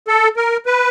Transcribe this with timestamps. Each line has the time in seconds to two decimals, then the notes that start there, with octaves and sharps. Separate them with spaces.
0.08 A4
0.37 A#4
0.66 B4